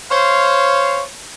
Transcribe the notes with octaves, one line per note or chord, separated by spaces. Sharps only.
C5 C#5 F5